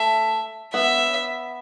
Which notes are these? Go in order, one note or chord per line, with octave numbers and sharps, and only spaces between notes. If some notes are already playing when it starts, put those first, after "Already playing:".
Already playing: A3 E5
B3 E5